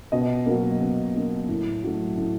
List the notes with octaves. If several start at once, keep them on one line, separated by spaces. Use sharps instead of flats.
B2 D#5
F#3 A#3
B2
F#3 A#3
A2
F#3 A3
A2